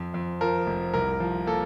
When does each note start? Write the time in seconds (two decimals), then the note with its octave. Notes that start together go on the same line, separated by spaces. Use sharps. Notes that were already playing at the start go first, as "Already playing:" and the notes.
Already playing: F2
0.14 F2
0.41 F3 A#4
0.67 F1
0.94 C2 A#4
1.20 F3
1.47 A#3 A4